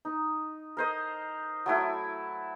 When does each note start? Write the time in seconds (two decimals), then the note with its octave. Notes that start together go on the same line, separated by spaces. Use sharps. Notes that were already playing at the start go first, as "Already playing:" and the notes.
0.05 D#4
0.77 A#4 C5 D#5
1.66 F#3 A3 E4